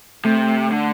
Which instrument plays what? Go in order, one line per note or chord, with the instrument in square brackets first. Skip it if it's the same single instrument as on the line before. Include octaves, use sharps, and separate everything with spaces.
[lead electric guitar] C3 [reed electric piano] A3
[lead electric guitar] D3